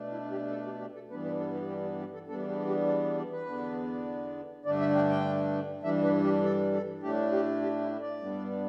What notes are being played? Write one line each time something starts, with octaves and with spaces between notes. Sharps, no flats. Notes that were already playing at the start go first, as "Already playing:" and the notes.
Already playing: B2 A3 D4
E4
G4
A4
G4
G4
A4
G2 E3 G3 B3 D4 B4
B4
A4
G4
G4
E4
G4
A4
E2 E3 G3 B3 D4 A4
G4
G4
A4
D5
B4
E2 D3 B3 D4
G2 D3 A3 D4 D5
E5
G5
G5
G2 E3 G3 D4 E5
B4
G4
A4
A4
A2 A3 D4 G4
G4
G4
E4
D5
G2 G3 B3 D4